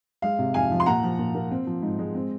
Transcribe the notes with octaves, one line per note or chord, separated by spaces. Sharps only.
G#3 F5
C3
F2 F5 G#5
F3
C6
A#2 F#5 A#5
F3
A#2
A#3
C4
F3
G#2
G#3
C4